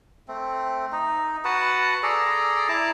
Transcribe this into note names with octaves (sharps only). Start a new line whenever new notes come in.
A3 C4
D#4
F#4 B4 F#5 A5
G#4 A4 D5 A#5
E4 A5 A#5 D6